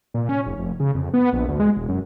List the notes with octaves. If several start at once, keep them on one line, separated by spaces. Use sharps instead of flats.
A#2
C#4
F1
F1
C#3
F2
B3
A#1
D2
G#3
E1
F#2